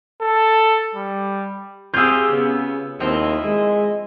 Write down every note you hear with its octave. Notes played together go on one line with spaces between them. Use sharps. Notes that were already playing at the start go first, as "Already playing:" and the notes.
A4
G3
C4 F4 G4 G#4 E6 G6
C#3 B3
D#2 F3 C4 E4 D#5
G#3